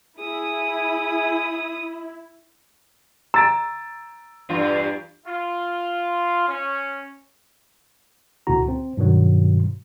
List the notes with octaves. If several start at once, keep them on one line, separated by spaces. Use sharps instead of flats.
E4 G#4 D#6
A#5 E6 A6 D7
E2 G2 F4
F4
C#4
C#2 A#2 D3 E4 F#4 A#5
C4
G2 B2 D#3 F#3